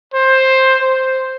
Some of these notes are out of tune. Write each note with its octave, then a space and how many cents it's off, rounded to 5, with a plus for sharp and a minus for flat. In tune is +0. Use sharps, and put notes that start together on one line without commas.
C5 +10
C5 +0